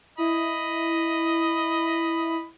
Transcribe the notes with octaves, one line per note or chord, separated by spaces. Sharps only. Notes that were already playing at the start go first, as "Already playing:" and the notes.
E4 D#5 B5